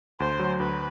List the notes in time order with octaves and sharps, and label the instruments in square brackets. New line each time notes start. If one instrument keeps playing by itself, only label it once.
[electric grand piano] D2 [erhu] C5
[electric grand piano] F#3
[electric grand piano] D2 [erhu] B4